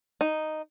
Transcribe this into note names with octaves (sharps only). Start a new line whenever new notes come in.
D#4